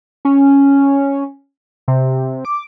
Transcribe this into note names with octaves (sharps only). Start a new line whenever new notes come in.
C#4
C3
D6